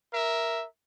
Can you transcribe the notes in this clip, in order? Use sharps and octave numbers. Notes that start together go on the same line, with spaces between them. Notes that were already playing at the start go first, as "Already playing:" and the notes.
A#4 E5